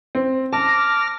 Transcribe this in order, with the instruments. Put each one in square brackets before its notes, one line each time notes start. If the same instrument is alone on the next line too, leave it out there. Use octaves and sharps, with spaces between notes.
[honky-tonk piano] C4
[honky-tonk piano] A5 [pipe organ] D6 F6 A#6